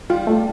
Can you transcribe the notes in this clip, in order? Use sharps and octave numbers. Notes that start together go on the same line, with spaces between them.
G3 F4
A3